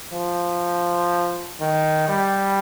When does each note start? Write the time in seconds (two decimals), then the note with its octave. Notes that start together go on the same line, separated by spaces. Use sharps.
0.13 F3
1.61 D#3
2.08 G3